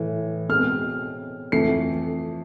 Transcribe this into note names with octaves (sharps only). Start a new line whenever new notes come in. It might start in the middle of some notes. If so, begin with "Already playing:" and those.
Already playing: A2 E3
B2 G#3 C4 F6
F2 E3 A3 C7